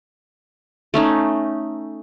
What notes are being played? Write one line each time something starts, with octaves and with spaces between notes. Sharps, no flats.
A3 C#4 D#4